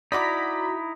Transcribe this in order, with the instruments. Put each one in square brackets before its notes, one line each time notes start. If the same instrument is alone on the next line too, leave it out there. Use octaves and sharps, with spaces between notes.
[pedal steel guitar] D#4 E4 [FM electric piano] F#4 A#5 B6 [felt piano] D5 B5 D6